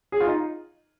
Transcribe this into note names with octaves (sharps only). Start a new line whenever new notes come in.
G#4
F4
D#4